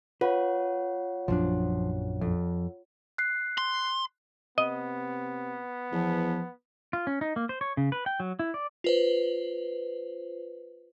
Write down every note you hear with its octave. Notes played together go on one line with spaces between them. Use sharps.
F4 B4 C#5 F#5
A#1 F#2 F3 D4
F2
F#6 C7
C6
C3 B3 D#5
E2 F3
F4
C#4
D#4
A#3
C5
C#5
C#3
B4
G5
F#3
E4
D5
F4 B4 C5